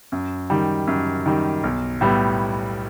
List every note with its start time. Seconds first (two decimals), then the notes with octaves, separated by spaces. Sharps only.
0.12 F#2
0.50 D#3 G3
0.87 F#2
1.26 D#3 G3
1.64 B1
2.01 A2 G3 B3